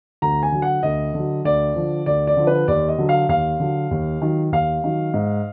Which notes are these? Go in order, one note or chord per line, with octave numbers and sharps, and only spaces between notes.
D2 A#5
G#5
D3 F#3
F#5
D2 D#5
D3 F#3
D2 D5
D3 F3
D2 D5
D5
D3 F3
B4
D#2 D5
D#5
D3 F#3
F5
D#2 F5
D3 F#3
D#2
D#3 F#3
D#2 F5
D#3 F#3
G#2